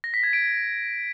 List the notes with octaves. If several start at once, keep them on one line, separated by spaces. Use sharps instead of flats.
A#6
B6
G#6
D7